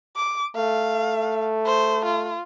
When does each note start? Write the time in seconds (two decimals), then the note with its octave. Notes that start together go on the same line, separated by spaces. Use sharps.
0.16 D6
0.56 A3 F5
1.66 C5
2.06 F4